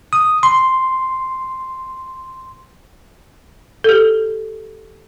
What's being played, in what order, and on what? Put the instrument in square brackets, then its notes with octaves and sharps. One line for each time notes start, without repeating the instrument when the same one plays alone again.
[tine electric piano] D#6
C6
[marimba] G4 A4